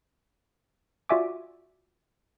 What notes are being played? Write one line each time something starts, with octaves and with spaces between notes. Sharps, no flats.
F4 F#4 D5 E5 G#5 D6